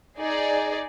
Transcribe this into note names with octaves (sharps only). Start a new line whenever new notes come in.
D#4 G#4 D5